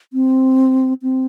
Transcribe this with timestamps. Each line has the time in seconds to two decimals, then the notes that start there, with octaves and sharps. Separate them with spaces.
0.13 C4
1.02 C4